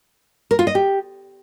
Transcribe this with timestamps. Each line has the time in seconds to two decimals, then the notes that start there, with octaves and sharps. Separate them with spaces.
0.51 A#4
0.59 F4
0.67 D#5
0.75 G4